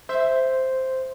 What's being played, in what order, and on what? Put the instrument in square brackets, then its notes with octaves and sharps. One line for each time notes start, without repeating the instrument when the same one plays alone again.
[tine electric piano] C5 [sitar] E5